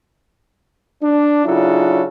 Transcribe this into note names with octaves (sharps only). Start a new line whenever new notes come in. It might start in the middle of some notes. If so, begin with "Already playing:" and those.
D4
C#3 F#3 D4 E4 F4 A4